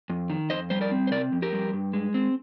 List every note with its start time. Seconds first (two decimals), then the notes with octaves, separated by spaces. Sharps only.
0.10 F2
0.30 D#3
0.50 F2 C5 D#5
0.70 G3 C5
0.81 A#4 D5
0.91 C4
1.07 C5
1.11 C3 A#4 D5
1.32 F2
1.42 G4 A#4
1.53 G3
1.73 G2
1.93 G#3
2.14 C4